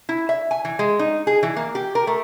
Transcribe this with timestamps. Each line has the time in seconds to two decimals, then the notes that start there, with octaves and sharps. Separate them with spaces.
0.09 E4
0.29 E5
0.51 G#5
0.65 E3
0.79 G#3
0.99 D#4
1.27 G#4
1.43 E3
1.57 A#3
1.75 G4
1.95 A#4
2.07 A3